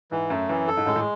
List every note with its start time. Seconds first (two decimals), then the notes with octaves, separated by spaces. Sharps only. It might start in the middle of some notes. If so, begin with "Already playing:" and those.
0.11 G#2 E3
0.30 F#2 A3
0.49 F#2 E3
0.68 F#2 A4
0.77 G#2
0.86 F#2 A2 G#3
0.96 A2